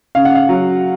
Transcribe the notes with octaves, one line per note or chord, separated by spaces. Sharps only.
C#3 F5
F#5
F5
F#3